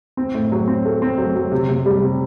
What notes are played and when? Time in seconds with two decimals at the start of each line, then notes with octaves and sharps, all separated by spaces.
0.17 C4
0.34 A2
0.52 F#3
0.68 C4
0.85 A3
1.02 C4
1.18 F#3
1.36 F#3
1.52 C3
1.69 C3
1.86 G3
2.02 C3